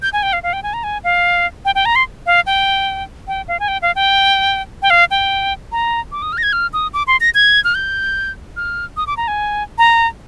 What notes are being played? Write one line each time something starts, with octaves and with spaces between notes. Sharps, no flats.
G6
G#5
G5
F5
F5
G5
G#5
A#5
G#5
F5
G5
G5
A#5
C6
F5
G5
G5
F5
G#5
G5
F5
G5
G5
F5
G5
A#5
D6
D#6
F6
A#6
G#6
F6
D#6
D6
C6
A#6
G#6
F6
G6
F6
D#6
D6
A#5
G#5
A#5